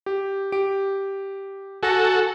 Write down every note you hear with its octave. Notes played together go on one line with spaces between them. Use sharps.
G4
G4 D7
F#4 A4 G#5 A#6